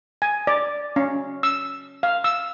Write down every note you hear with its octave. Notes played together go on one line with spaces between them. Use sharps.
G#5
D5
C#4
E6
F5
E6